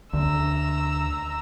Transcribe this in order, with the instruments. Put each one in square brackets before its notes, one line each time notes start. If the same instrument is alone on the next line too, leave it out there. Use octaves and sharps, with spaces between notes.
[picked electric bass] D2 [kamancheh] A#5 E6